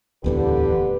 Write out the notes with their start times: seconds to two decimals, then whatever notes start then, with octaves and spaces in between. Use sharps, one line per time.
0.24 D1 E2 A2 D3 G4 B4